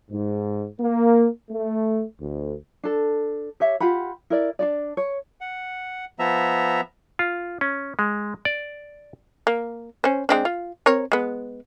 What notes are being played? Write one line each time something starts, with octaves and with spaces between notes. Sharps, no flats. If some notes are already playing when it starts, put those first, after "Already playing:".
G#2
A#3
A3
D2
D4 A4
G4 C#5 E5
F4 G4 F#5 B5
E4 A#4 D5
D4 F#4 D5
C#5
F#5
F3 B3 E5 A#5
F4
C#4
G#3
D5
A#3
C#4 C5
G#3 C4 D4
F4
C4 A#4 C#5
G#3 B3